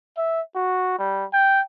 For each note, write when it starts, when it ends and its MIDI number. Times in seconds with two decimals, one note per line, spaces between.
0.17 0.41 76
0.55 0.98 66
0.99 1.25 55
1.33 1.61 79